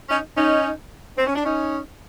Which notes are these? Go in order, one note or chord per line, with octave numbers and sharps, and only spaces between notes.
C#4 D#4
C#4 D#4
C4
C#4
D4
C#4 D#4